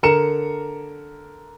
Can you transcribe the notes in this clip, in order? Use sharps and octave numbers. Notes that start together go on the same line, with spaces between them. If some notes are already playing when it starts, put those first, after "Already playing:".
D3 A#4 A#5 C#7 E7